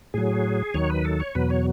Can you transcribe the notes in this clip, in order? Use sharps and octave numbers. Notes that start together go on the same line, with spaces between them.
A2 F#3 G#4
D#2 D#3 F#3 C#5
B4
A4
C#5
E2 B2 F#3 B4
C#5